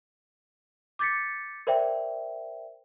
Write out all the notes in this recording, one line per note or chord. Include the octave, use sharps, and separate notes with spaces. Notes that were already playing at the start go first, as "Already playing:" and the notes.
D6 G6 A6 B6 C#7
A#4 C5 D5 E5 G5